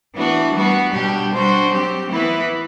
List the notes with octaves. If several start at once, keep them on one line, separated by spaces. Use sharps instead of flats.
E3 B3 D4 F#4
G3 B3 F#4
B2 G3 D4 G4
G3 D4 F#4 C5
F#3 C4 G4
E3 B3 E4 B4